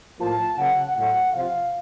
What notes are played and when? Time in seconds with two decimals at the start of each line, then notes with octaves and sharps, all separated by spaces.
0.19 A2 F3 A#3 F4 A5
0.57 C#3 F#3 A#3 F#5
0.95 A2 F#3 A3 F#5
1.33 C3 F3 C4 F4 F5